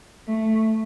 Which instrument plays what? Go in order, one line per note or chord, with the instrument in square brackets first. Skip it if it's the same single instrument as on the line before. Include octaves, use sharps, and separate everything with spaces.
[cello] A3